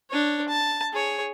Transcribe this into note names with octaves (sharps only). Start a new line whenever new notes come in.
D4 C#5
A5
G#4 C#5